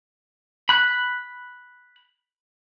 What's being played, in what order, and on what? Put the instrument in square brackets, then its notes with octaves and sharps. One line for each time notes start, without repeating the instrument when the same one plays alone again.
[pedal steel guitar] B5 F#6